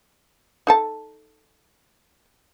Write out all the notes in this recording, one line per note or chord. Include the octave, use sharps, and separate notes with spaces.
D#4 A4 A5